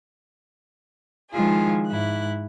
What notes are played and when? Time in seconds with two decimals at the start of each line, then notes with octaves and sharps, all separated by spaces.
1.31 D#3 F3 G#3 E4 F4 G#4
1.88 G#2 E4 F#6